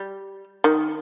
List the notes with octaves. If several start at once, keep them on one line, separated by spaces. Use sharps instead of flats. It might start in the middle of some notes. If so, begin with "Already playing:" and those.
Already playing: G3
D#3